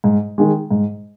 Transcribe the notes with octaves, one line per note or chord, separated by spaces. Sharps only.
G#2
D#3 G#3
G#2